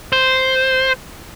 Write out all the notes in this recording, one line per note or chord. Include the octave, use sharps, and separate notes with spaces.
C5